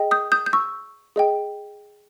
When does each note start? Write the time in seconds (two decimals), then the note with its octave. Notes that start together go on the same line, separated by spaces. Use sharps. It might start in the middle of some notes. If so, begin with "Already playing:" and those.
Already playing: G#4 D#5 G5
0.11 D#6 G6
0.32 D#6 G6
0.46 G6
0.53 C#6 E6
1.16 G#4 D#5 G5